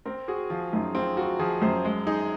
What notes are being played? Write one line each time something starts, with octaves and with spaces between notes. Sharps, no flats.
C4 A#4
F#4 G#4
F3 F4
F#2 D#4
C4 F4
F4 F#4
F3 G#4
F#2 C5
G#3
D#4 G#4